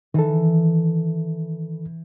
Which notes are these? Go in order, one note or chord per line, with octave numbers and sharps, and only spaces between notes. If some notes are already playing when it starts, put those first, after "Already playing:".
D#3 E3 A4